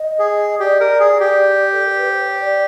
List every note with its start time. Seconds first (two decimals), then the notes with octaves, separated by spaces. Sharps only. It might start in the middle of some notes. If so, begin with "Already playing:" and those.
Already playing: D#5
0.19 G#4
0.60 G4 D5
0.80 A#4
1.00 G#4
1.20 G4
1.74 A4
1.86 A#4
1.98 B4
2.09 C5
2.21 C#5
2.41 D5